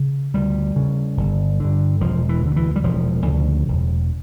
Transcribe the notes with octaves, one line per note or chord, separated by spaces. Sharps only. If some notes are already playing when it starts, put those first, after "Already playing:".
Already playing: C#3
D2 G3
C#3
G1
G2 D3
E1 F3
E3
D2 D3
E3
G3
E1 F3
D2 C#3
E1